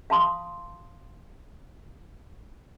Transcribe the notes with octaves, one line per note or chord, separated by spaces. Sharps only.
F5 A5 C6 D#6